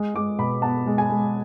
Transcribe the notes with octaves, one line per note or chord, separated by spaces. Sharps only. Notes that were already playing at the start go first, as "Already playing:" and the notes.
Already playing: G#3
G#3 D6
B2 B5
B3 A5
G#3
G#5
G#3